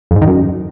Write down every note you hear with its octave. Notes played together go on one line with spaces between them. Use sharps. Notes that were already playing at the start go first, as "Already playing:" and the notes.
F2
G#2
D#3
F#2